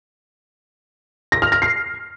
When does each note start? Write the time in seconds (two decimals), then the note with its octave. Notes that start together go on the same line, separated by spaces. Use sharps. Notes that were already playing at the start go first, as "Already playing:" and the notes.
1.32 A#6
1.42 F6
1.52 A#6
1.62 C7